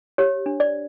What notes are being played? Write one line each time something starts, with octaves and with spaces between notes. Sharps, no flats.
G4 C#5
D4
D5